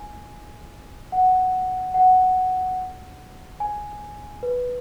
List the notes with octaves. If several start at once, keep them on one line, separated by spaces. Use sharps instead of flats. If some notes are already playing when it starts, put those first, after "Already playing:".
Already playing: G#5
F#5
F#5
G#5
B4